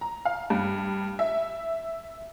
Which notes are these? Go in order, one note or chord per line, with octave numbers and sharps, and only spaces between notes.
A#5
F5
G2
E5